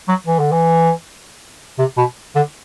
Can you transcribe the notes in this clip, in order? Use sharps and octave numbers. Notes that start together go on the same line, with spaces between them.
F#3
E3
D3
E3
C3
B2
D3